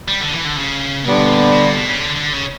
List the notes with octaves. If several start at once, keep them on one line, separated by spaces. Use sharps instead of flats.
G3
D3
E3
D3
C#3
B2 D3 G3 B3
A#2
B2
A#2
B2
C#3
D3
D3
C#3